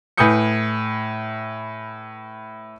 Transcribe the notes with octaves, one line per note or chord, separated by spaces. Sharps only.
A2 B4 G#5 D#6 G6 C#7